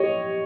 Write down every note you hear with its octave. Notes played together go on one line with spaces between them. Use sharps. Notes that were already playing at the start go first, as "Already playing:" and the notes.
Already playing: G4 C#5 D#5